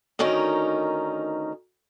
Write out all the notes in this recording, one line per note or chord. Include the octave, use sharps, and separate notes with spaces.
D2 D#3 C#4 D#4 A#4